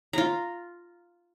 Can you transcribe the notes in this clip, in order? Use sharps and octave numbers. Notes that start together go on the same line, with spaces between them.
F4 A#5